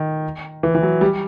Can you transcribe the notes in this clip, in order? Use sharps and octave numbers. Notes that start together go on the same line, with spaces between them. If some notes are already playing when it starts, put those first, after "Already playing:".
Already playing: D#3
E3
E3
F#3
G3